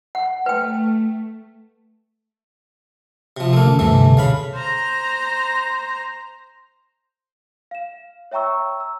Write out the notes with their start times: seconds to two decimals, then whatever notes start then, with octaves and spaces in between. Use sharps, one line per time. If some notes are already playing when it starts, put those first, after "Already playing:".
0.15 F#5
0.46 A3 B4 G5
3.37 C3 F3
3.53 A3 A#3
3.64 D3 C#4
3.79 D2 G2 C3 D#3 E3 A3
4.03 B2 D3
4.17 C#3 F5 B5
4.54 C5 A#5
7.71 F5 E7
8.32 C#5 E5 G5 A#5 C#6 E6
8.80 E6